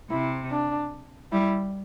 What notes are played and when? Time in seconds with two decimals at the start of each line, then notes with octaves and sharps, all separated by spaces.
0.10 C3 E4
0.51 D4
1.32 G3 E4